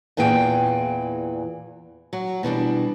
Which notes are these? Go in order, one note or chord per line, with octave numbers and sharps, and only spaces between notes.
E2 A#2 E3 G#4 G5
F#3
B2 E3 G3 D4